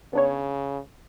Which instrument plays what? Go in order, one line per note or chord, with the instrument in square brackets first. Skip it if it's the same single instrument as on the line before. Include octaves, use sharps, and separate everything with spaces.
[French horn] C#3 [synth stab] B3 D4 C#5